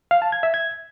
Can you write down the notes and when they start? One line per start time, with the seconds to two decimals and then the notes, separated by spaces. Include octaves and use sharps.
0.11 F5
0.22 A5
0.32 G#6
0.43 E5
0.54 G#6